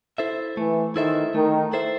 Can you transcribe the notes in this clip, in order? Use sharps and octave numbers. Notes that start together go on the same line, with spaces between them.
E4 A4 C5 E5
E3 A3
D#3 E4 A4 C5 E5
D#3 A3
E4 A4 C5 E5